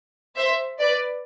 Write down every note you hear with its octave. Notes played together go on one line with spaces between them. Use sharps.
C5 E5
B4 D5